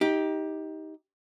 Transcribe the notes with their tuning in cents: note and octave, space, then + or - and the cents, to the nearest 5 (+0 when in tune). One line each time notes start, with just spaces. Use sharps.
D#4 +20 G4 +0